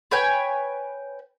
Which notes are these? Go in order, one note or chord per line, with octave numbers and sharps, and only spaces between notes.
B4 C#5 G5 G#5